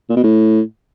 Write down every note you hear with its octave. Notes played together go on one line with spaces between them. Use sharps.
A#2
B2
A2